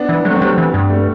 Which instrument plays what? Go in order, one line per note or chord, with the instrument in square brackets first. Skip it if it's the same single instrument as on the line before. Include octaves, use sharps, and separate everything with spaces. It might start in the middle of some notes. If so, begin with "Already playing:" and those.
Already playing: [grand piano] B3 D4
[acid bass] E3
[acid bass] F#3 [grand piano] A3 C4
[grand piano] C4
[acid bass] F#3 [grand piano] G3 B3
[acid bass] E3
G2
[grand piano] A3